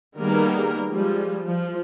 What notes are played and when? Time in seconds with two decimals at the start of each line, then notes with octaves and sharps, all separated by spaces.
0.19 D#3 G3 A#3 B3 G#4 A#4
0.91 F3 G3 G#3
1.46 F3